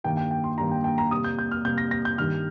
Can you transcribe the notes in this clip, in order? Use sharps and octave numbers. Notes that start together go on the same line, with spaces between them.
G2 D#3 G3 A#3 G5
G5
G5
C6
G2 D#3 G3 A#3 A#5
G5
G5
A#5
C3 G3 A#3 D#6
G6
G6
F6
C3 G3 A#3 G6
A#6
A#6
G6
G2 D#3 G3 F6